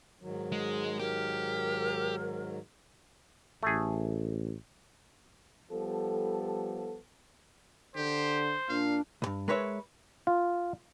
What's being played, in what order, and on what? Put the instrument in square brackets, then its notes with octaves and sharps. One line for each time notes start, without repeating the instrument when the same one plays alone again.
[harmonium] G#2 D#3 F#3
[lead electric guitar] G#3
[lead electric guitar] G4 [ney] A#4
[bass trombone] A1 [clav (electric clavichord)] A3 G#4
[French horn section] F3 G3 B3 A4
[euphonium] D3 [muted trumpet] G4 [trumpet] C5
[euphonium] A#2 [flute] D4 [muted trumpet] F5
[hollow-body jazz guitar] C2 G2
G#3 A#4 B4 C#5 E5
[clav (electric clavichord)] F4